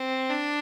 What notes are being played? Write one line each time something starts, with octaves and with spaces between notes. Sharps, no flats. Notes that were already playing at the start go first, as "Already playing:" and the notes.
Already playing: C4
D4